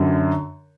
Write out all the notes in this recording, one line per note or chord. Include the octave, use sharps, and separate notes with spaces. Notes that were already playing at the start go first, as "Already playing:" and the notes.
Already playing: F#2 D3